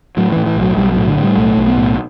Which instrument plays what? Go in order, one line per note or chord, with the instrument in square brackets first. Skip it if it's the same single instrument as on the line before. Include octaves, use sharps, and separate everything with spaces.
[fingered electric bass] A2 F#3
A2 E3
E3
B1 F#3
B1 G3
A2 F#3
D3
A2
G3
B1 A3
B1
B3
A2